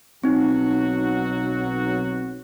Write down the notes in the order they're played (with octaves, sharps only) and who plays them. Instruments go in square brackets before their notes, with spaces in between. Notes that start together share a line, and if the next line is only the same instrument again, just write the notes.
[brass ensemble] B1 F#3 F#4 [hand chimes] C4 D#4